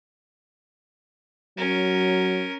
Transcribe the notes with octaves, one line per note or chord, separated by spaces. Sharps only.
F#3 C#4 A#4